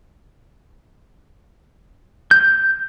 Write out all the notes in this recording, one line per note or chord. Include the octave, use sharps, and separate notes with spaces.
G6